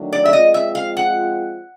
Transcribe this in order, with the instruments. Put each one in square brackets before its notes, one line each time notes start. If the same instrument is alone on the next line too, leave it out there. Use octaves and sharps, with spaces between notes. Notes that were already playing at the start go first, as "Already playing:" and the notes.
Already playing: [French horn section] D#3 F#3 A3 D4
[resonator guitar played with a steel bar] D5
E5
[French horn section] F3 G#3 C4 F4 [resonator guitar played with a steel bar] D#5
[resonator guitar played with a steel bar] E5
F5
F#5